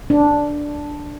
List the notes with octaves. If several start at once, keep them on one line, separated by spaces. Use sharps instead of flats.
D4